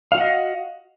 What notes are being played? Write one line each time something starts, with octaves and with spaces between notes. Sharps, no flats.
F#4 D#5 F5 F#5